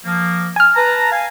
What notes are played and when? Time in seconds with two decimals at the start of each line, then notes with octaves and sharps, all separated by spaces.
0.05 F3 A#3
0.56 G#5 F6
0.75 B4 A5 A#5
1.12 F5 G#5